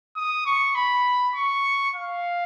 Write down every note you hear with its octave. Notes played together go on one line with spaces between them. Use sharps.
D#6
C#6
B5
C#6
F5